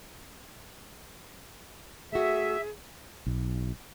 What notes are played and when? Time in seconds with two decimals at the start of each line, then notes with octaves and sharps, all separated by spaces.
2.13 A3 F#4 G#4 E5
3.26 B1